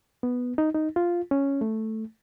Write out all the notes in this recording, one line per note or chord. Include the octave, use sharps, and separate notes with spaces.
B3
D#4
D#4
F4
C#4
A3